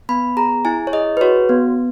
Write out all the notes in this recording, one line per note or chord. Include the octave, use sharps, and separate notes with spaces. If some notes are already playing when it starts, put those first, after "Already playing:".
B3 B5
G#4 A#5
E4 G#5
C#5
G#4 D#5
B4
F#4 C#5
B3